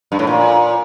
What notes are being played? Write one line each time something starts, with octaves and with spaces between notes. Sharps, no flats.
G2
A2
A#2